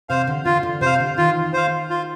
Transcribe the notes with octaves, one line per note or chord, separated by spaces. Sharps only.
C3 C5 F5
D3
D3 F4
D3
C3 C5 F5
D3
D#3 F4
C5 F5
F4